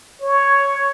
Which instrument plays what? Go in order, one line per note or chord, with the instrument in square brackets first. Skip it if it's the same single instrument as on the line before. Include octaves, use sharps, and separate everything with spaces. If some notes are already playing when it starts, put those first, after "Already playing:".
[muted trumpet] C#5